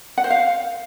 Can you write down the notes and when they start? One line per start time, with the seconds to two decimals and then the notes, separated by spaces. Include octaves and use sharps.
0.18 F#5
0.24 C5
0.30 F5